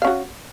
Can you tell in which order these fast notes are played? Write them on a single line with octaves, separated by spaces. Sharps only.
F5 C#4 F#4